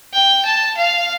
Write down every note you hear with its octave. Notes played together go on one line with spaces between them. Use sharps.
G5
A5
F5